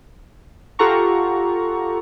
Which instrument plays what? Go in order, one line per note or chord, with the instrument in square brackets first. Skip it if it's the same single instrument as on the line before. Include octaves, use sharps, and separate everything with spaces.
[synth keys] F4 G4 A4 F#5 A#5 C#6